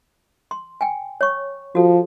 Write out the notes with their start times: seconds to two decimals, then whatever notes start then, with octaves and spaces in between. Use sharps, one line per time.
0.51 C6
0.81 G5 G#5
1.21 C#5 C#6
1.75 F3 F#4 A4